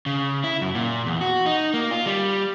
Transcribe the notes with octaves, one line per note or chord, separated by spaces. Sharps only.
C#3
E4
F#2
A#2
E2
F#4
D#4
A#3
F4
G3